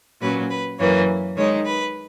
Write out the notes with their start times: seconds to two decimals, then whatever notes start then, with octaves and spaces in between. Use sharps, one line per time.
0.21 A#2 F#3 C#4 B4
0.50 B4
0.79 F#2 E3 A#3 C#5
1.36 D#3 G#3 D#4 C#5
1.65 B4